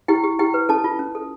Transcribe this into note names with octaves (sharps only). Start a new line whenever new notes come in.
E4 G4 G5
G4
E4 G4 G5
B4
C#4 A4 A5
F4
C#4
A4